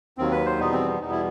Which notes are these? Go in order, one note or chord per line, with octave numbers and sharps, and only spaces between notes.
D#2 D#3 F#3 C4
B4
C5
E2 B2 G3 B3 D#4
C4
E2 B2 G3 B3 D#4
E4